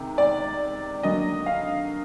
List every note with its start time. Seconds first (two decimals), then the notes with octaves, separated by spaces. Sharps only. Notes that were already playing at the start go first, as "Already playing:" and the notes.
Already playing: C3 D#3 G#3
0.18 D5
1.03 D3 F#3 A#3 D#5
1.46 F5